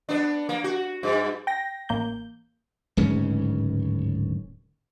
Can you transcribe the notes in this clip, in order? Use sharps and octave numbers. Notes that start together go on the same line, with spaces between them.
B3 D4
A#3
F#4
G2
G5 A#6
A1 A#3 G6
D1 G#2 C#3 C#4